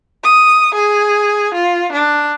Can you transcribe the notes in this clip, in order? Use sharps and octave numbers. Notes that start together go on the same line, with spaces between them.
D#6
G#4
F4
D4